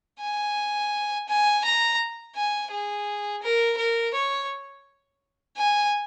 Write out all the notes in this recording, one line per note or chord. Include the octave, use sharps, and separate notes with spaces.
G#5
G#5
A#5
G#5
G#4
A#4
A#4
C#5
G#5